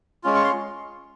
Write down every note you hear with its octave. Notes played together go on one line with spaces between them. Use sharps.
G#3 C#4 F4
C#6
C6